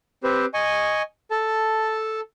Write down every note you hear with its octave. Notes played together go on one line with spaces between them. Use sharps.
C4 G4 B4 C5
D#5 G#5 C#6
A4 A5